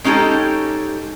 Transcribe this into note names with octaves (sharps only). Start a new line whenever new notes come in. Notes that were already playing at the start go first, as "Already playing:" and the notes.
G#3 C#4 D#4 G4 A4